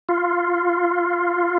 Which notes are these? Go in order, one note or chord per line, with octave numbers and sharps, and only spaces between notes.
F4